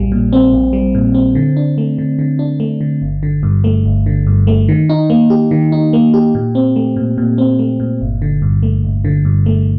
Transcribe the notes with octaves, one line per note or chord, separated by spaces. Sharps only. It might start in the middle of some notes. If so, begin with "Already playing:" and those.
Already playing: A#1 G3
A#2
C4
A#1
G3
A#2
C4
D3
D4
A3
D3
D3
D4
A3
D3
G1
D3
G2
A3
G1
D3
G2
A3
D#3
D#4
A#3
G4
D#3
D#4
A#3
G4
A#2
C4
A3
A#2
A#2
C4
A3
A#2
G1
D3
G2
A3
G1
D3
G2
A3